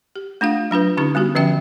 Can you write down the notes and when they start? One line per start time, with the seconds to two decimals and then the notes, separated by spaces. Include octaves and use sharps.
0.16 G4
0.41 A3 D4 F4 F5
0.71 F#3 D4 F4 B4
0.97 D3 C#4 D#4 F4 G4
1.15 G3 B3 F#4 G4
1.35 D3 F3 C#4 E5 G5